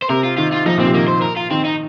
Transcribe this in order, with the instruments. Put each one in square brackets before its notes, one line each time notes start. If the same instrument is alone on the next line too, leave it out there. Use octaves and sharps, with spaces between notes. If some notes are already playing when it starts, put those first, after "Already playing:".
[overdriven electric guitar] C5
[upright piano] C3 [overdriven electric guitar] A#4
[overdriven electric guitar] F4
[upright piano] D#3 [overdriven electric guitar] F4
[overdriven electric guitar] F4
[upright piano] F3 [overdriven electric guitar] D#4
[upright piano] A#2 [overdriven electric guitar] C4
[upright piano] C3
[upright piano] D#3 [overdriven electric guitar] A#3
[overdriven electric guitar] C5
A#4
F4
[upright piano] D#3 [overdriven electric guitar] C4
[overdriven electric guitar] D#4